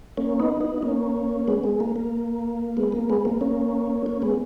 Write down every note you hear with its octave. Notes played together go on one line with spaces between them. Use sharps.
A#3 C#4
B3 D#4
B3 D#4
D#4
A#3 C#4
G#3 B3
G#3
A#3
A#3
G#3 B3
A#3
G#3 B3
A#3
A#3 C#4
A#3 C#4
G#3 B3